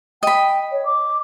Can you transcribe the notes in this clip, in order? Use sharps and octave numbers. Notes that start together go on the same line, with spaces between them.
D#5 G5 B5
C#5
D6